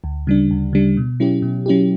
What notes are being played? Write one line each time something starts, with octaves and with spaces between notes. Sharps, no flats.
D2
C#3 G3 D4
D2
C#3 G3 D4
B2
F#3 C#4 E4 G4
B2
F#3 C#4 E4 G4